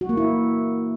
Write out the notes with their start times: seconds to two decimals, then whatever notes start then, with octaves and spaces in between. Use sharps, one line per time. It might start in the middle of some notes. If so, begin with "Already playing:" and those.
0.01 F#4
0.09 A#3
0.17 E4